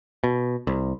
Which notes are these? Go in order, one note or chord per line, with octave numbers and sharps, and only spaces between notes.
B2
C2